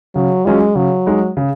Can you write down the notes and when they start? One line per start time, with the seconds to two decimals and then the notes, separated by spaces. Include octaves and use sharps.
0.15 C#3 F#3
0.45 F#3 G#3 C#4 F4
0.75 C#3 F#3
1.06 G#3 D#4
1.37 C#3